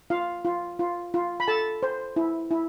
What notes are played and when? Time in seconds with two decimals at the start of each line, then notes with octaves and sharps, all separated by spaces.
0.10 F4 F5
0.45 F4
0.79 F4
1.14 F4
1.40 B5
1.48 A4 A5
1.83 C5
2.16 E4
2.51 E4